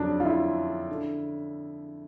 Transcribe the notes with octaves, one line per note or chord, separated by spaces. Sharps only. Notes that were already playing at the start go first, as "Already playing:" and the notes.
Already playing: F2 D3 F#3 D4
F4
E4
D3